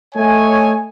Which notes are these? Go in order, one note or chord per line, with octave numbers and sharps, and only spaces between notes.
A3 C#5 D#5 G#5